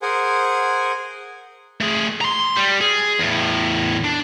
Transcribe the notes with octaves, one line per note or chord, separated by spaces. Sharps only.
G#4 A#4 C5 F#5 G#5
A3 G#4
A#5 C6
G3
G#4
E2 A2
D4